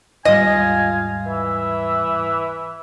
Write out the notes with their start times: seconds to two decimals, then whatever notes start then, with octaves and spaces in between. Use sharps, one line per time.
0.25 D#2 G#2 G3 F4 D#5 F5 G#5
1.26 E3 E5